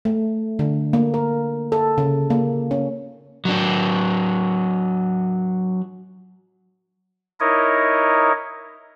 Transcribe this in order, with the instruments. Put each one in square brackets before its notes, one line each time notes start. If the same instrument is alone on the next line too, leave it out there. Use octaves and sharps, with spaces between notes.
[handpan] A3
D3
A#3
A#4
A4
C#3
A#3
C#4
[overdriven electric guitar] F#3 D4
[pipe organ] D#4 E4 A#4 C#5 D#5